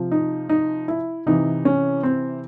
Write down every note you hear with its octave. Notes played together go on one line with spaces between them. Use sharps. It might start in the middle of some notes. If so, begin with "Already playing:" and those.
Already playing: C3 F3
D#4
D#4
E4
C3 E3 D#4
C#4
C4